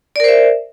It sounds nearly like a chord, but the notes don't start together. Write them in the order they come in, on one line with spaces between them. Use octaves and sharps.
D5 A#4 C5 E5